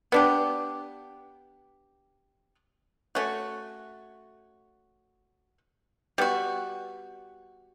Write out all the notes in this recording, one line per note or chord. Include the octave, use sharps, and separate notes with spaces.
B3 D4 G4
A3 C#4 F#4
G3 B3 F#4